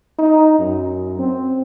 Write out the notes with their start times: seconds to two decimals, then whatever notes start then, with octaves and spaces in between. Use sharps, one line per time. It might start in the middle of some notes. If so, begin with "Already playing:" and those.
0.18 D#4
0.59 F#2
1.18 C4